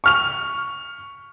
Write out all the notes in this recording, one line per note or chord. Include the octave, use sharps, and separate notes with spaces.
C#6 F6 F7